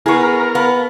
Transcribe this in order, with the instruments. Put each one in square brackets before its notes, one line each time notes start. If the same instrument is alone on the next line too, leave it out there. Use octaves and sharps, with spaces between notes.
[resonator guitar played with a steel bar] B3 G#4 [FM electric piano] E4 C#6 [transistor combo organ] A#4
[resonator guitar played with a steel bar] B3 [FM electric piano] F5 A5